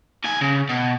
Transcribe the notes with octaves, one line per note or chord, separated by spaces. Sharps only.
D#2 G#5
C#3
B2